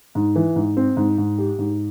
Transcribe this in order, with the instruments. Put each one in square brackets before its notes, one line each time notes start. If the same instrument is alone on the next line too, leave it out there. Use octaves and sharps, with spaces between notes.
[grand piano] G#2
E3
G#2
C4
G#2
G#2
G4
G#2